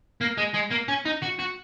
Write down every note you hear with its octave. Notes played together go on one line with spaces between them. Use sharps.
A#3
G#3
G#3
A#3
C#4
D#4
F#4
F#4